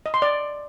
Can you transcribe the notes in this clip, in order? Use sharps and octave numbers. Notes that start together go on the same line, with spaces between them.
D#5
C6
D5